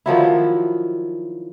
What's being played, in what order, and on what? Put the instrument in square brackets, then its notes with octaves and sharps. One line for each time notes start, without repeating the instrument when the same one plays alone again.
[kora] D#3 F3 F#3 E4